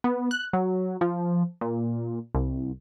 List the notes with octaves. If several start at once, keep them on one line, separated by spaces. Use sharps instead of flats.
B3
F#6
F#3
F3
A#2
C2